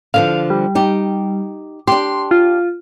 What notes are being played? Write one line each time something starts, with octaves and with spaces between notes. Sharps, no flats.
D3 E3 F3 F5
G3
D#4 G4
D4 G4 C6
F4